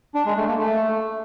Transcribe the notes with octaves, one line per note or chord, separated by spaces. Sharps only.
D4
G#3
A3
A#3
A3